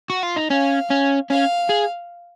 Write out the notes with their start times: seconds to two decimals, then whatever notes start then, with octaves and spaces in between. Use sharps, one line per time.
0.10 F#4
0.23 F4
0.36 D#4
0.50 C#4 F5
0.90 C#4
1.30 C#4 F5
1.69 G#4